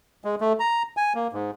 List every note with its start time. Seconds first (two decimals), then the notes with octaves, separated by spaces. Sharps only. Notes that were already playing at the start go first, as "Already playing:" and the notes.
0.25 G#3
0.41 A3
0.60 A#5
0.97 G#5
1.15 A#3
1.33 G#2